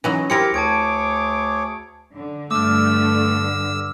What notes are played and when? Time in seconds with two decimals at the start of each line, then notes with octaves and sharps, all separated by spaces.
0.04 E3 F#3 C#4 D#4
0.30 C4 E4 G4 A#4 C#7
0.54 D2 G#4 C#5 A5 D6 G#6 D7
2.15 D3
2.51 G2 D3 A3 D6 E6 F6